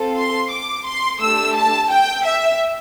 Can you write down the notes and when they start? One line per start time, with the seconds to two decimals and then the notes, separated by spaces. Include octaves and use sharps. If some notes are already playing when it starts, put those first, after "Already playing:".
Already playing: C4 F4 A4
0.18 C6
0.52 D6
0.87 C6
1.21 A3 D4 G4 E6
1.56 A5
1.91 G5
2.25 E5